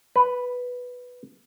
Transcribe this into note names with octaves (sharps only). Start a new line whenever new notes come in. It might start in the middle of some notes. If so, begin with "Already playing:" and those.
B4